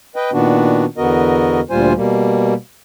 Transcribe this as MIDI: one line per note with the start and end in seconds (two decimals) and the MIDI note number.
0.16 0.30 71
0.16 0.30 75
0.16 0.30 79
0.32 0.85 46
0.32 0.85 51
0.32 0.85 59
0.32 0.85 62
0.32 0.85 66
0.97 1.60 40
0.97 1.60 50
0.97 1.60 59
0.97 1.60 66
0.97 1.60 70
0.97 1.60 75
1.70 1.93 38
1.70 1.93 46
1.70 1.93 55
1.70 1.93 65
1.70 1.93 72
1.70 1.93 80
1.96 2.54 47
1.96 2.54 55
1.96 2.54 58